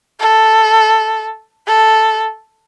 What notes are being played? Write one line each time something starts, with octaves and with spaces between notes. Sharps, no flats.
A4
A4